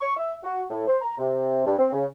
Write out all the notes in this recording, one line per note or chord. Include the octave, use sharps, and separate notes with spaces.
C#6
E5
F#4
A2
C5
A#5
C3
G2
C4
C#3